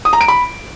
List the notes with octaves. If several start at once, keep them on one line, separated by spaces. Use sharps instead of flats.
D#6
A#5
D7
B5